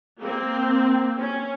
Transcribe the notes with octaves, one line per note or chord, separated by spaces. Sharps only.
A#3 C4
C#4